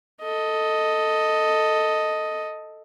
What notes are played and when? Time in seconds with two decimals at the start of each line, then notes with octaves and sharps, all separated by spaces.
0.22 A4 D#5